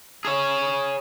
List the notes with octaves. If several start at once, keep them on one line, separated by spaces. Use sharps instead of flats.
G#4 C#5